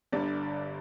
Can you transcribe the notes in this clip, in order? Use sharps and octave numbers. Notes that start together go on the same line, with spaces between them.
G1 G2 D3 D5